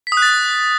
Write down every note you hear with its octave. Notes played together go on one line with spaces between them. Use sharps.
B6
D#6
F#6
A6